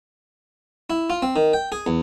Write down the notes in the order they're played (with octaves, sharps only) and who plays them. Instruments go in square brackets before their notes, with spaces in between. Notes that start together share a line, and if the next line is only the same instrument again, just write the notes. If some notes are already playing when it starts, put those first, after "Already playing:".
[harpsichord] E4
F4
C4
D#3
G5
G#4
E2